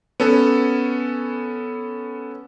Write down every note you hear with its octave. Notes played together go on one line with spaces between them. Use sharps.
B3 C#4 A4